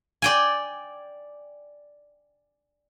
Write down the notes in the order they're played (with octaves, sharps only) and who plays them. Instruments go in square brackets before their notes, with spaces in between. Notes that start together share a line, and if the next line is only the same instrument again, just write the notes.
[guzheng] D5 G5 G#5